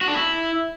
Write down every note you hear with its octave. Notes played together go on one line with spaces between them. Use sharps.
F#4
D4
E4